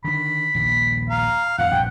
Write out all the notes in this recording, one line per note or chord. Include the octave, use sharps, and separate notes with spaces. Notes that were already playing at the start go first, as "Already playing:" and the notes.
D3 D#3 B5
A#1 D#2
F5 A#5
F2 A2 D3 F5 F#5
A#1 G2 C3 G5